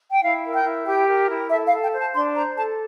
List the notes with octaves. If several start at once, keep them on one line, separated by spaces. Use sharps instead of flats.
G5
E4 F5
A#4
G5
E4
G4 G5
A#4
E4
A4 E5
F5
A4
G5
C5
A5
D4 C6
C5 A#5
A4 A5